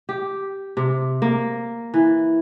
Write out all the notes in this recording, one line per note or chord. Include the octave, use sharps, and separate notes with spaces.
G4
C3
A#3
E3